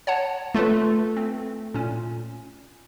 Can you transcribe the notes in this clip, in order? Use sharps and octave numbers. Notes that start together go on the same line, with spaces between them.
C#5 F#5 A5
A3 F4 B4
C4
A#2 C#4